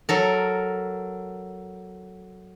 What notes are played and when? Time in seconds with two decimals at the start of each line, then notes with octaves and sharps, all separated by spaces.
0.09 F#3 A4 A#4